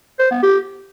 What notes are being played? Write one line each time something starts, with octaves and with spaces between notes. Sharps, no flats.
C5
B3
G4